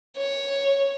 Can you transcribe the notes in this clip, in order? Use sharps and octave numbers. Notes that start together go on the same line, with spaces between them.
C#5